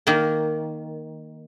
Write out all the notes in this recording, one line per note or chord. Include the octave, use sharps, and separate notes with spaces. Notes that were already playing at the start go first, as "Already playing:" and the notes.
D#3 A#3